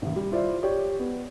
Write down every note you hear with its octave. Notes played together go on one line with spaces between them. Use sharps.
A1 D#2
G3
E4 F4 C5 D5 E5
G4 C#5 D5
B3